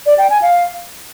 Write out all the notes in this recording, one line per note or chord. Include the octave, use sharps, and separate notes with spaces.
D5
G5
G#5
F5